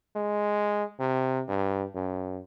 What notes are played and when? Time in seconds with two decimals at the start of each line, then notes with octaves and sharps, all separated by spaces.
0.16 G#3
1.00 C3
1.48 G2
1.95 F#2